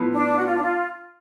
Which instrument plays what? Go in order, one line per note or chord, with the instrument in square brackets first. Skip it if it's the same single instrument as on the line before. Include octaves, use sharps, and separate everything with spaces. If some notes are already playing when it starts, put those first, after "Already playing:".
Already playing: [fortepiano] A2 F3 B3
[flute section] D4
F#4
F4
D4
F4